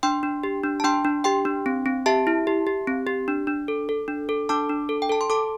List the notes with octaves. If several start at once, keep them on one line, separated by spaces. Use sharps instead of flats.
D4 G5 C6
D4
G4
D4
A5
D4 G5 C6
D4
G4 G5 C6
D4
C4
C4
G4 E5 A5
E4
G4
G4
C4
G4
D4
D4
A4
A4
D4
A4
D4 A5 D6
D4
A4
G5
A4 A5
C6
A4 A5 D6